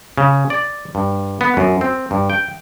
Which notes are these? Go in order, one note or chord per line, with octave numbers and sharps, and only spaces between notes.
C#3
D5
G2
B3
F#2
C4
G2
G5